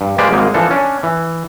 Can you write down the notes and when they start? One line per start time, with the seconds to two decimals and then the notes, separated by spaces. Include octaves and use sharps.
0.01 G2
0.18 G#3 A#3 G4 B4 C5 D5
0.31 G#1 G#2 G#3 A#3 D#4
0.54 E3 F3 D4 A4
0.71 C#4 D4
1.03 E3